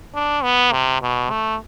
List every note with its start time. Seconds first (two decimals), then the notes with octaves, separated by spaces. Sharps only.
0.15 D4
0.43 B3
0.72 C3
1.02 B2
1.30 A3